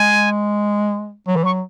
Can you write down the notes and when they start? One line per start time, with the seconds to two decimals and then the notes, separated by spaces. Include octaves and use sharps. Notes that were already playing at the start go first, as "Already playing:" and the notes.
Already playing: G#3 G#5
1.28 F#3
1.36 E3
1.44 F#3 C#6